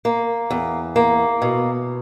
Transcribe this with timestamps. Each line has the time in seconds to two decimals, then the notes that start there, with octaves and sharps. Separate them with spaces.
0.05 A#3
0.50 E2
0.96 A#3
1.42 B2